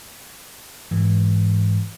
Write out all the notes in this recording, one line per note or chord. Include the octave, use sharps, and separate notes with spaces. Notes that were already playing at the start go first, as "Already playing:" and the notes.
G#2 E3